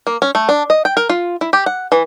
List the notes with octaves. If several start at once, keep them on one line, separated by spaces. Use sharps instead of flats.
A#3
C#4
A3
D4
D#5
G5
A#4
F4
E4
G4
F#5
E3